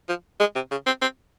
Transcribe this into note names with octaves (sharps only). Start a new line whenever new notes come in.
F3
G#3
C3
C#3
C4
C4